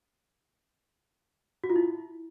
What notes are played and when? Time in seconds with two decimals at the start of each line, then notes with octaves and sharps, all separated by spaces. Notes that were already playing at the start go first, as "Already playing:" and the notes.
1.64 F#4
1.70 F4
1.76 E4